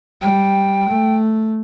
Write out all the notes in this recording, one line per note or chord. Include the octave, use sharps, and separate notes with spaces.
G3 G5
A3